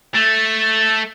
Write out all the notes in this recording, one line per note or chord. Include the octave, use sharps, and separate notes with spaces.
A3